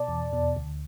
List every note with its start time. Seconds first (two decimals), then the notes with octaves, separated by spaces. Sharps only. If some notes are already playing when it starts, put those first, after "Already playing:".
Already playing: B2 D5 A5
0.08 E2
0.33 B2
0.56 D2